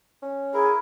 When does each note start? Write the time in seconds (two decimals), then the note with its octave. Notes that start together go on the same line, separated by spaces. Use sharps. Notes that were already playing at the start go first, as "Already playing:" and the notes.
0.22 C#4
0.54 E4 G#4 A#4